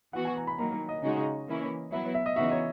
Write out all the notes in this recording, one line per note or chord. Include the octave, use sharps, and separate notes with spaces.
E3 B3 F#4 F#5
G#5
A#5
B5
D#3 F#3 A#3 A#5
D#5
C#3 G#3 D#4 F#4
E3 A#3 C#4 E4
F#3 B3 E4 E5
E5
D#5
C#3 E3 B3 D#4 F#4 E5
C#5